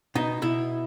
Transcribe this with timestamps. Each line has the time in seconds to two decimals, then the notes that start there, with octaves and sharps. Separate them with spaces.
0.15 B2 D#4
0.42 B2 E4